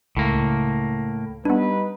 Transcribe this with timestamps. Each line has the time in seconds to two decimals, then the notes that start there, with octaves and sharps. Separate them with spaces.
0.16 C#2 A2 A#3
1.45 G3 B3 D4 D#4 B4